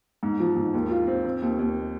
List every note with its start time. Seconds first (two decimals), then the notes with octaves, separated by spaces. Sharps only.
0.23 G#2
0.40 F3
0.56 G#2
0.74 D#2
0.91 F4
1.07 C4
1.25 C4
1.42 D#2
1.59 D#2